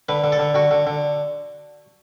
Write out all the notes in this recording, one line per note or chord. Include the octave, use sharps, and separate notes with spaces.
D3 B4
D3
A4
D3
D3 F#4
D3
D3